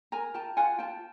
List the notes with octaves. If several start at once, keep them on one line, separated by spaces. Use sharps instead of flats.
A#4 G#5 A#5
F4 G5 A5
F4 F#5 G#5
F4 G5 A5